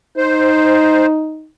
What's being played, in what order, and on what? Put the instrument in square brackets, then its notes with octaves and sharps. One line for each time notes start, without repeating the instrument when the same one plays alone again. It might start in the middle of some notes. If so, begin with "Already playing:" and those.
[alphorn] D#4 [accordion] C5